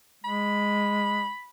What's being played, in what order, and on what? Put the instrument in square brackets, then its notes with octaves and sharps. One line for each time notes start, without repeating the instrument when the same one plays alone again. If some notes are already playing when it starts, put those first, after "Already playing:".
[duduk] G#3 [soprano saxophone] B5